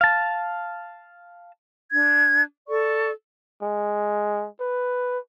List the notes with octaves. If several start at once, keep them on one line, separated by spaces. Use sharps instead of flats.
F5 A5
D4 G#6
A4 D5 C#6
G#3
B4